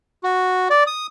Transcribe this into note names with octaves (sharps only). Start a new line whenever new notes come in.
F#4
D5
D#6